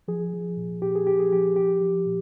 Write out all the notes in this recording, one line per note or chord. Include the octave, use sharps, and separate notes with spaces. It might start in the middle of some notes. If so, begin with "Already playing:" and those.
F3 G#4
F3
A#2
A#2 G4
G#4
F3 G4
G#4
F3 G4
F3 G4
F3
A#2